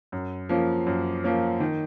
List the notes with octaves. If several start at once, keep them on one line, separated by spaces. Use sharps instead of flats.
F#2
F3 A#3 C#4
F#2
F3 A#3 C#4
D#3